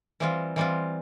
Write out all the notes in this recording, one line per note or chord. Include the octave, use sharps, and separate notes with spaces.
E3 G3 C4 F4
E3 G3 C4 F4